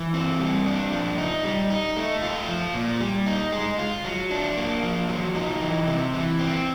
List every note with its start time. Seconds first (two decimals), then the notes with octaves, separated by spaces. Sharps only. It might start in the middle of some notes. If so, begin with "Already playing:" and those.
Already playing: E3
0.14 C4
0.40 G3
0.66 D4
0.92 F3
1.18 D#4
1.44 G3
1.70 D#4
1.96 A3
2.22 F4
2.48 F3
2.74 A#2
3.01 G3
3.26 D#4
3.52 G#3
3.79 F4
4.04 F#3
4.31 D4
4.57 A#3
4.83 F3
5.09 F#3
5.35 D#4
5.61 E3
5.87 C3
6.13 E3
6.39 C4